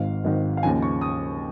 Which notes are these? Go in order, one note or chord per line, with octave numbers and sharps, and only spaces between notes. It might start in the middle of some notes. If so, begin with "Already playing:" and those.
Already playing: G#1 G#2 D#3 F5
G#1 G#2 D#3
F5
D#2 C#3 F3 G#5
C#6
D#6